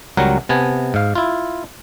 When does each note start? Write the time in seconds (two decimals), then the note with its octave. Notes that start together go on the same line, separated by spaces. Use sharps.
0.17 C#2 F#3 G3 A#4 F#5
0.49 C3 B3 G#5 A5
0.94 G#2 F5
1.15 E4 F4